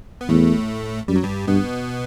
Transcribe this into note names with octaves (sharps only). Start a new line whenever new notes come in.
B3
E2 A2 A3
F#2 G3
F#3
G2 G3
G2 B2 B3